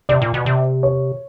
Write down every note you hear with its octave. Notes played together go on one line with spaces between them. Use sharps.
C3 D5
A#2
B2
C3
C#5